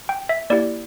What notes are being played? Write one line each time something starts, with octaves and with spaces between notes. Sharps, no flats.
G5
E5
A#3 E4 G4 D5